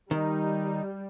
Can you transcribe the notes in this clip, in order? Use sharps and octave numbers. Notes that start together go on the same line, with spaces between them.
D#3 G3 D#4